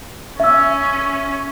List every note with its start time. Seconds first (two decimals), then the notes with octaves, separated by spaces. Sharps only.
0.40 C#4 E5 E6